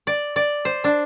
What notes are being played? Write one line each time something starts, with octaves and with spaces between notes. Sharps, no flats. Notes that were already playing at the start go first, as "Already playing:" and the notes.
D5
D5
C5
D4